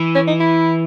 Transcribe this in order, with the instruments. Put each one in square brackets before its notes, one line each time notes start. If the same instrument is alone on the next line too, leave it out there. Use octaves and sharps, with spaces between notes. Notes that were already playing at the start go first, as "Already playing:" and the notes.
Already playing: [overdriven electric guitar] E3
[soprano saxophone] C#4
D#4
E4